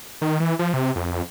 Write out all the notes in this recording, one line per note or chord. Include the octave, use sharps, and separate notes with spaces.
D#3
E3
F3
C3
F2